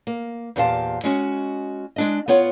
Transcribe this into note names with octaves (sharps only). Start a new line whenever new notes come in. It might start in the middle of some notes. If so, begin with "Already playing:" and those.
A#3
E2 A#2 G4 C5 F5 A5
G#3 C#4 F#4
G#3 D4 D#5
B3 F4 C#5 F#5